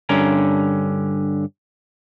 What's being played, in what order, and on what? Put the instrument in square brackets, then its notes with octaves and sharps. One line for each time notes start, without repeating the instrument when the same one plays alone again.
[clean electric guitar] G2 D3 C#4 A#4